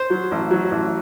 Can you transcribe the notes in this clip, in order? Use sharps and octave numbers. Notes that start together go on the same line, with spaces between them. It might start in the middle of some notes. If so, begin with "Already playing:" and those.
Already playing: C5
F#3
A1
F#3
A1